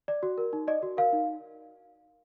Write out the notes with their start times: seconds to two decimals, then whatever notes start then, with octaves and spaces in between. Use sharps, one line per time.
0.08 D5
0.23 F#4
0.38 A#4
0.53 D#4
0.68 D5 D#5
0.83 F#4
0.97 A#4 F5
1.13 D#4